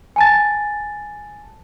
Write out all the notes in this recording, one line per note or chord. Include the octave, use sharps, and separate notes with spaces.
G#5 A5 A6